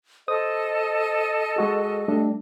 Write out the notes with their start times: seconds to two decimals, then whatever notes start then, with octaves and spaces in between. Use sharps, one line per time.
0.28 A4 C5 D#5 D#6
1.56 G#3 F#4 G#4
2.08 G3 A3 D4